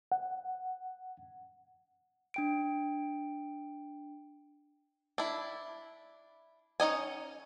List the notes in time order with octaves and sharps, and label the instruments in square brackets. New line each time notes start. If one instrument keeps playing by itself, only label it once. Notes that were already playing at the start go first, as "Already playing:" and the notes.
[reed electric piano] F#5
[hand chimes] D4 G5 D7
[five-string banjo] D4 E4
C#4 D#4 D#5 G#5